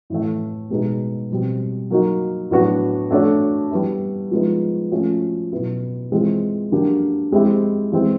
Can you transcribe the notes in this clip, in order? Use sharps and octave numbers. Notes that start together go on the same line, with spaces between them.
A2 E3 A3
B2 G#3 B3 D#4 G#4
B2 G3 C4
F#3 A#3 D#4 F#4
A2 F#3 B3 D4 F#4
A3 D4 F#4 A4 C#5
G3 B3 E4
F3 G#3 B3 D#4
F3 A3 C#4 F#4
B2 F#3 B3 E4
E3 G#3 C4 F4
D3 F#3 A#3 D4 G4
G#3 C4 E4 G4
E3 G#3 C4